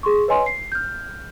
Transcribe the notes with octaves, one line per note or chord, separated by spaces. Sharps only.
G#4 C6 C#6
B4 C#5 D#5 G#5 C6
C7
F6 G6